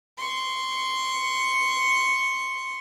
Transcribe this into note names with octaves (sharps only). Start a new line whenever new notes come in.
C6 C#6